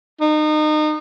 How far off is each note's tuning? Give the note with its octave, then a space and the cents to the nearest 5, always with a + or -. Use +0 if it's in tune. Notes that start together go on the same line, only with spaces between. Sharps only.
D#4 -30